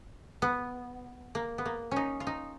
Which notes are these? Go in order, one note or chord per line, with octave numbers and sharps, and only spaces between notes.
B3
A#3
B3
A#3
C#4 D#4
F4
D#4